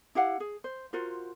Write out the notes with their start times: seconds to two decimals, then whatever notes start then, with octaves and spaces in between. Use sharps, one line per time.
0.15 E4 G4 F5 F#5
0.40 G#4
0.64 C5
0.93 F4 F#4 A#4 C5